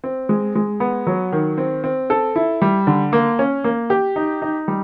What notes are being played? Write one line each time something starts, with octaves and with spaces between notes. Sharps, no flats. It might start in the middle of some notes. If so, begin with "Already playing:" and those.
C4
G#3
G#3
B3
F#3
D#3
C4
C4
A4
E4
G3
D3
A#3
C#4
A#3
G4
D#4
D#4
G3